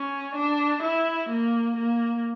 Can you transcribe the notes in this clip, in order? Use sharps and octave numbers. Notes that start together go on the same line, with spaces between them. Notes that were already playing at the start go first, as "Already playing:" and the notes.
Already playing: C#4
D4
E4
A#3
A#3